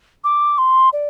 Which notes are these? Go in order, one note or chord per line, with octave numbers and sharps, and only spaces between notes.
D6
C6
D5